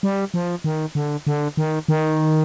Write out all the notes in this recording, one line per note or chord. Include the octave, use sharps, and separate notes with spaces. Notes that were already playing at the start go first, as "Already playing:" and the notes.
G3
F3
D#3
D3
D3
D#3
D#3